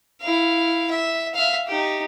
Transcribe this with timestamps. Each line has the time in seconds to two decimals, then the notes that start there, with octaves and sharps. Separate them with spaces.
0.21 E4 F5
0.90 E5
1.34 E5 F5
1.67 D#4 G4